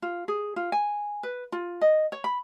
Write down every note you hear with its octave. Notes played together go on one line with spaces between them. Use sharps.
F4
G#4
F4
G#5
B4
F4
D#5
C#5
B5